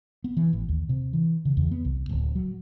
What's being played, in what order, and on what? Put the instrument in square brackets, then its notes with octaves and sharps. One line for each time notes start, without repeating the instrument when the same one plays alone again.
[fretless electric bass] B3
E3
A1
D#2
C3
E3
C#3
E2
B3
C2
D1
F#3